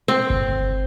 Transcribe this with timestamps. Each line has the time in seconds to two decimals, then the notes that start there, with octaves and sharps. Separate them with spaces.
0.08 C4
0.30 G1